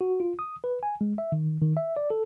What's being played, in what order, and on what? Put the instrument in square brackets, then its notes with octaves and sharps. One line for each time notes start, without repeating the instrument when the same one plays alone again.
[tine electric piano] F#4
F4
D#6
B4
G#5
G#3
E5
D#3
D#3
E5
D5
A4